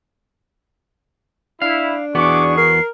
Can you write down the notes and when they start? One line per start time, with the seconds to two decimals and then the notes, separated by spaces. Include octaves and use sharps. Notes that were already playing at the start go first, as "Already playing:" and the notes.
1.62 D4 E4 F5
2.15 E2 B3 F#4 G#4 C#6 D6
2.57 A#4 C7